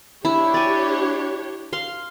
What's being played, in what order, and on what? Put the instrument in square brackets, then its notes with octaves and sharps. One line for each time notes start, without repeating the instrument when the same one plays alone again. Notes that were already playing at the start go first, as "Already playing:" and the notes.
[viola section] D4 G4 C#5 [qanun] E4
[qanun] D5 G#5
F5 C6